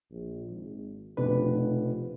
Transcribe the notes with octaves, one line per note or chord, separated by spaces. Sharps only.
A#1
G#1
F1 B2 D4 B4